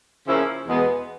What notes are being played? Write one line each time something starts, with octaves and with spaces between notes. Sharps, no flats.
C#3 F3 A#3 C#4 E4
E2 B2 G#3 B3